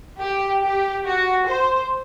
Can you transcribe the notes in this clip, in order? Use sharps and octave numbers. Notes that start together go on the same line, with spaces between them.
G4
G4
F#4
C5